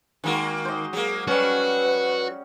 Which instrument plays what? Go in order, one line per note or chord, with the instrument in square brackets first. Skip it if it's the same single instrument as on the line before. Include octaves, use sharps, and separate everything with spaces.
[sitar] D#3 A#3 F#4 [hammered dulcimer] G#3
[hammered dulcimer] C5 D#5
[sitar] F#3 A#3 [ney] G#4
[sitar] F#3 [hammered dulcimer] G3 C#4 [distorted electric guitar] F#4 [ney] B4